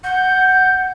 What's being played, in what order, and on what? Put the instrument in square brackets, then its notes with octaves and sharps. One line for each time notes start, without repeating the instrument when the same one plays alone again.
[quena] F#5 [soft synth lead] G6